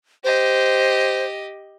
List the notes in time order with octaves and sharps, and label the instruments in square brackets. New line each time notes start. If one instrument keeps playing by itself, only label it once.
[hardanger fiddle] G4 D#5 [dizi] C5